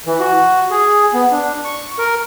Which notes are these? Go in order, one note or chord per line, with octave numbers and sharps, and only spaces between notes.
E3
F#4
G#4
B3
D4
C#6
A#4